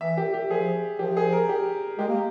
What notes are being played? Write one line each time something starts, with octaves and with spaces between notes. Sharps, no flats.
E3 E5
G4
G4
F3 G#4
F3 G4
G#4
A#4
G4
G#3 G4
A#3